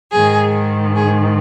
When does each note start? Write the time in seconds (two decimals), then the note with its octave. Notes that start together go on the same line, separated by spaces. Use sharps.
0.12 G#2 D#3 G#4
0.96 G#4